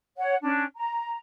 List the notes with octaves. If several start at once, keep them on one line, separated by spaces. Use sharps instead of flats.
C#5 F#5
C#4 D4
A#5